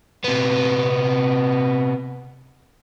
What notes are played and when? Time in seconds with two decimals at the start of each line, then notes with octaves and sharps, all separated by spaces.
0.24 C3 B3